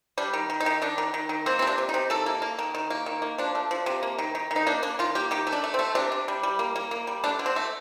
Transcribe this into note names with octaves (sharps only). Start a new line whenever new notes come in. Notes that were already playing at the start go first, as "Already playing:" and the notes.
G3 D4
D#3
D#3
D#4
D#3
D#3 D4
D#3
D#3
D#3
A#3 C4
C4
C3 D4
C3
D#4
C3
D#3 A4
A#3
A#3
D#3
D#3
A#3
D#3
A#3
F3 D4
A3
F3
C3
A#3
D#3
D#3
D#3
D#4
A#3 D4
A#3 D4
D#3 F4
A#3 G4
D#3 G4
A3
D4
A3
C4
A3
C3 D4
C3
G3
G3
A#3
A#3
A#3
G3
A3 D4
D3
C4
A3